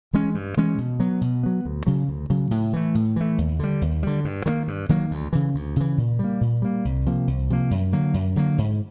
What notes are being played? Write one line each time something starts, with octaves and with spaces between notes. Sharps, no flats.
E3 G#3 C#4
G2
E3 G#3 C#4
B2
F#3 B3
B2
F#3 B3
D2
C#3 F#3
D2
C#3 F#3
A2
E3 A3
A2
E3 A3
D#2
D3 G3
D#2
D3 G3
G2
D#3 F#3 A#3
G2
D#3 F#3 A#3
D2
C#3 E3
D2
C#3 E3
A#2
G3 A#3
A#2
G3 A#3
C2
C3 F3 A#3
C2
C3 F3 A#3
F#2
D3 F#3 A#3
F#2
D3 F#3 A#3
G#2